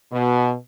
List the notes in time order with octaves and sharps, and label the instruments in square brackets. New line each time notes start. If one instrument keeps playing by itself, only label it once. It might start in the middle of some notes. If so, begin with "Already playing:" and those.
[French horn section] B2